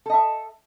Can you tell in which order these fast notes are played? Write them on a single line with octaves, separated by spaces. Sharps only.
A4 D#5 E5